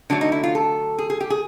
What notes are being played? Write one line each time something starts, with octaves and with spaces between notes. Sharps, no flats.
D3 F#3 A3 D4
D#4
E4
F4
A4
G#4
G#4
G4
G#4